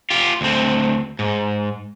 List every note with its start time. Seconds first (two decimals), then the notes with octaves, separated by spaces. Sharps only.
0.10 F4 G4
0.41 D2 C4
1.19 G#2